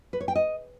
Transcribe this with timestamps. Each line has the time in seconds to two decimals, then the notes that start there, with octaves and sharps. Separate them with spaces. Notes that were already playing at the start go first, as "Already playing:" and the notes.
0.13 B4
0.21 C#5
0.28 G5
0.35 D#5